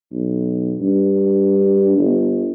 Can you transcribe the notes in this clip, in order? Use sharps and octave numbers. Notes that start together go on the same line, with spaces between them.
B1
G2
G1